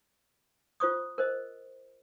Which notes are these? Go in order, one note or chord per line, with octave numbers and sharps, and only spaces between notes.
F4 C5 C#6 D#6
A#4 C5 D#5